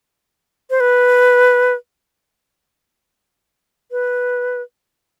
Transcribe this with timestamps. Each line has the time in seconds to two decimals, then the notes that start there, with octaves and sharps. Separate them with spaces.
0.70 C5
0.80 B4
3.91 B4